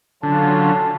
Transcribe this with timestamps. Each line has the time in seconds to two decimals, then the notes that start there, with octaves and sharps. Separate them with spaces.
0.23 D3 F#3 C#4 F4 A4